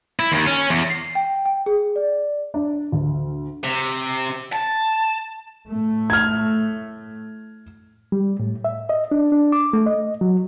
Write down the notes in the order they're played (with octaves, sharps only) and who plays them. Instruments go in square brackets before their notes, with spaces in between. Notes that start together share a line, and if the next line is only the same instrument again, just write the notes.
[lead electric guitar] E4
D#2
C#4
E2
[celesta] C7
G5
G5
G#4
D5
[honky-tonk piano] D4
D2
[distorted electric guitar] C3
A5
[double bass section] A2 A3
[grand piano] F6 G#6
[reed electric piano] G3
A2
E5
D#5
D4
D4
D6
A3
D#5
F#3